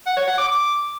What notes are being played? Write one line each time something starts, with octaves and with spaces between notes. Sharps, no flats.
F#5
C#5
F#5
D6
D6